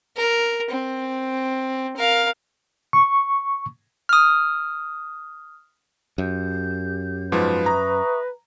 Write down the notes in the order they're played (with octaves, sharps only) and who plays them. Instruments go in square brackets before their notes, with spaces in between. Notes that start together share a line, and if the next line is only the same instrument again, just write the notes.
[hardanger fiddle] A#4
C4
A#4 F5
[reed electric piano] C#6
[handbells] D#6 F6
[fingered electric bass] F#2 [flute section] G4 G6
[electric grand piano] G#2 F3 [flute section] F#4 [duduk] B4
[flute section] E5 C#6 D#6 [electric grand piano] A#5